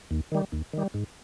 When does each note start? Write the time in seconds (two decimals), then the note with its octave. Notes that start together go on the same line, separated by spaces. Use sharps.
0.11 D#2
0.32 D#3 G3
0.52 D#2
0.73 D#3 G3
0.94 G#2